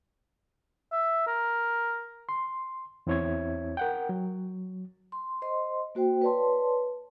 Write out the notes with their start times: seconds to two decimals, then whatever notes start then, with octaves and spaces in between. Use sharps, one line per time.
0.92 E5
1.27 A#4
2.29 C6
3.07 E2 C4 E4 C#5 E5 G#6
3.77 A#4 F#5 G5
4.09 F#3
5.12 C6
5.42 C5 D#5 C6
5.95 A#3 F#4 C5 G5
6.22 B4 C#5 D5 A5 C6